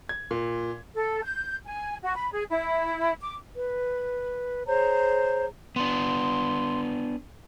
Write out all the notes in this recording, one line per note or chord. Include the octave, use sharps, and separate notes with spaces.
G#6
A#2
A4
G6
G#5
F#4
B5
G#4
E4
D6
B4
G#4 C5 C#5 A#5
B3 D4 C6